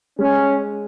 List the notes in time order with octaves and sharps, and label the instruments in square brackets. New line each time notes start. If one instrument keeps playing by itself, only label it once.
[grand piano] G#3 [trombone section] C#4